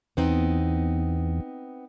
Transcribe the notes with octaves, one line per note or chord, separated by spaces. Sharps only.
E2 B3 C4 D#4